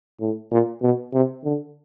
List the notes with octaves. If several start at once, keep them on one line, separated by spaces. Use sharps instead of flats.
A2
A#2
B2
C3
D3